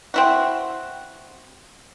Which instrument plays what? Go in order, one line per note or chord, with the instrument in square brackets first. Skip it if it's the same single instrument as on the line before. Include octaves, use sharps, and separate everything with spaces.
[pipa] C4 E4 F#4